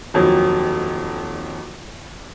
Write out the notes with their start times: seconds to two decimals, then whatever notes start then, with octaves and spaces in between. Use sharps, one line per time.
0.14 D#1 F2 F#3